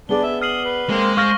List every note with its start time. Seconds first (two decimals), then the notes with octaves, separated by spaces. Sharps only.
0.09 B3 D4 G#4 D5 G7
0.23 E5
0.42 D#6 F6 C7 F#7
0.65 B4
0.89 G#3 A#3 C4
1.17 C5 F5 C#6 F6 A#6